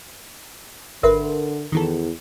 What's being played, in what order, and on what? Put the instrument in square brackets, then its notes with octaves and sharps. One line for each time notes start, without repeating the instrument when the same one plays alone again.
[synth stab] G#1 B4 C6 [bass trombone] D3 [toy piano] A#4 E5
[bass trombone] E2 [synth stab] D#3 E3 A4